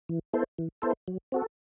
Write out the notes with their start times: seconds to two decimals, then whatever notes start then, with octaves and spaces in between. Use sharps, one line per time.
0.09 E3
0.33 B3 E4 A4 C5
0.58 E3
0.82 B3 E4 A4 C5
1.08 F#3
1.32 C4 F#4 A4